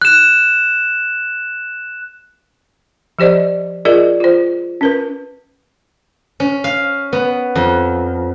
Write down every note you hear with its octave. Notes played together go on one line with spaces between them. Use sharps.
F#6 E7
F3 G4 C5 D5 D#5
F4 G#4 A#4 D5 D#5
F4 C5
C#4 A#4 B4
C#4
F5
B3
F2